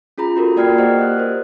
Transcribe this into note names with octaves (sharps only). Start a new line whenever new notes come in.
C#4 F4 G#4 A#5 B5
F4 F#4 A4 A#4
A#3 D5 G5 F6 G#6 C7
A#3 G4 C5 D#5 F#5 F6
D#5 F#6
A#4 C5